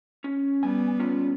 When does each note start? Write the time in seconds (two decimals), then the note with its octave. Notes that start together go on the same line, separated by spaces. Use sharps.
0.24 C#4
0.63 G3 B3 G#5
1.00 C#4 F4